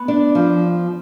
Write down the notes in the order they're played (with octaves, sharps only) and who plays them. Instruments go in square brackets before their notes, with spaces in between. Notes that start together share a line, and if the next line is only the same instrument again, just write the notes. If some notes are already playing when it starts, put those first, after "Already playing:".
Already playing: [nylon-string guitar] B3
D4
F3